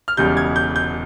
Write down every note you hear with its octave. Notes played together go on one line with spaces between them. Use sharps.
F6
E1 E2 C#3 G3 G6
G#6
G6
G6